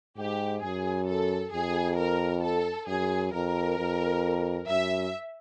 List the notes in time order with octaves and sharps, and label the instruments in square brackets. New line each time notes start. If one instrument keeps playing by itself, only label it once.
[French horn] G#2 [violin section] G4
[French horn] F#2 [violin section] G#4
[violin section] A4
[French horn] F2 [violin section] G#4
[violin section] A#4
A4
[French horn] F#2 [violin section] G#4
[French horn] F2 [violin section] A#4
[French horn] F2
[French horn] F#2 [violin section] E5